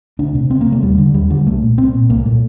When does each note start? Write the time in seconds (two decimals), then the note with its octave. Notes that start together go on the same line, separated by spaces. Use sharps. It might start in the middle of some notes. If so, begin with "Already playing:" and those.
0.19 D2 D4
0.35 C3
0.50 D2 C4
0.61 A#3
0.67 C3
0.72 A3
0.83 D#2 G3
0.98 D3
1.14 D#2 G3
1.30 D3 G3
1.46 C2 A3
1.62 A#2
1.77 C2 C4
1.94 A#2
2.09 C2 A#3
2.26 A#2 A3